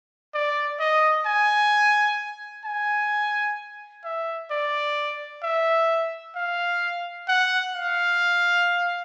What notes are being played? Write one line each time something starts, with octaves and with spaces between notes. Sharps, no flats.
D5
D#5
G#5
G#5
E5
D5
E5
F5
F#5
F5